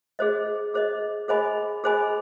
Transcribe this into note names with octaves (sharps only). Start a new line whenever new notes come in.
G#4 C5 D#5
G#4 C5 D#5
G#4 C5 D#5 G#5 B5
G#4 C5 D#5 G#5 B5